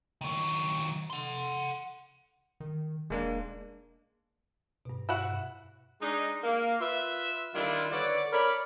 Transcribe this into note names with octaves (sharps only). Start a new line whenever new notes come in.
D#3 F#3
F#5 C6
D#3
E1 G#3 A#3 D4
G2 B2
E4 F#4 F#5
G#3 D4 D#4
A#3
F4 B4 E5
D#3 G3 D4 E4 F4
D3 B4 C#5 D5
A#4 C#5 D5 B5